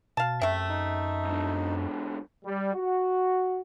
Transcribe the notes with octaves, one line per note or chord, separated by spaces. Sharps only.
B2 F5 A5
F#2 C3 A3 E5
D#4
G#2 D3
G3
F#4